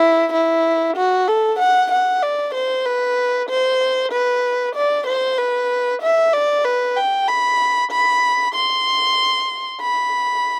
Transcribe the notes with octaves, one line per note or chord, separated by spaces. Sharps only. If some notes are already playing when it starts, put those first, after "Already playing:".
Already playing: E4
E4
F#4
A4
F#5
F#5
D5
C5
B4
C5
B4
D5
C5
B4
E5
D5
B4
G5
B5
B5
C6
B5